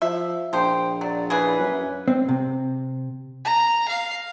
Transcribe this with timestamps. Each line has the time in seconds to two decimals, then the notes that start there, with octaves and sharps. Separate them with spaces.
0.02 F3 E5
0.53 A#1 F3 C5 G5
1.01 F#3 D5
1.30 C#3 E3 G#4 B4
1.59 F#2
2.08 C4
2.28 C3
3.45 A#5
3.88 F5